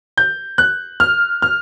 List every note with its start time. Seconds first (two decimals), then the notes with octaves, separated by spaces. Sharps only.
0.17 G6
0.58 F#6
1.00 F6
1.42 F6